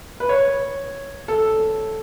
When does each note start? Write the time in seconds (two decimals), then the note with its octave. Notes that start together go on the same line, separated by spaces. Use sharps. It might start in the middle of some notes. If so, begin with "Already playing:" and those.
0.20 B4
0.29 C#5
1.28 A4